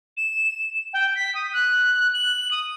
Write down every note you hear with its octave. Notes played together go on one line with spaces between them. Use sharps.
E7
G5
B6
D#6
F#6
F#7
D#6